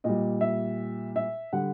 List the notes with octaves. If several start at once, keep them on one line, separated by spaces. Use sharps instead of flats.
A#2 G3 D#5
E5
E5
D3 G3 F#5